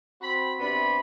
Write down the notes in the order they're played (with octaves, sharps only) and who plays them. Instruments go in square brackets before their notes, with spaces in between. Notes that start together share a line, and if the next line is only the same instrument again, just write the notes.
[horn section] C4 F#4 B5
C3 B3 D4 B5